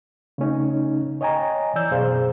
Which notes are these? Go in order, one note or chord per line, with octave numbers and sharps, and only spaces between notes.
C#3 A3 C#4 D#4
C#5 D#5 G5 G#5 A#5
E3 D5 E6 G6
F#2 B2 G#4 C5 F5